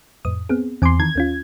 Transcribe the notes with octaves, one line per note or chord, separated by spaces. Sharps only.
F2 A2 D#6
B3 C4 G#4
E2 C4 G#5 C6 D6
D#3 E3 G#6
D#2 C#4 F4